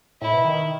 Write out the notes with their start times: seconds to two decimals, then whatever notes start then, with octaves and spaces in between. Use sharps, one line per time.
0.21 A2 E4
0.33 B2
0.44 D#3